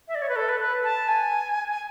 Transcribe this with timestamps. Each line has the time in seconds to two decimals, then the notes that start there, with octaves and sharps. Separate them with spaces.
0.08 E5
0.15 D5
0.22 C#5
0.29 B4
0.36 A4
0.49 B4
0.60 B4
0.84 A5
1.08 G#5
1.70 G#5